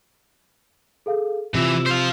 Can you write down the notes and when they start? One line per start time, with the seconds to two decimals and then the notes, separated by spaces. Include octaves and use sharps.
1.06 G#4 A4 F5
1.55 C3 E3 F4 E6 E7
1.87 C5 F5